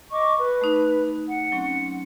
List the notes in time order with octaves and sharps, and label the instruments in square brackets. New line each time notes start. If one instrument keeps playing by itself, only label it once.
[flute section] D#5 C#6 D6
B4
[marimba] A3 D#4
[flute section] F#5
[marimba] F#3 C4 C#4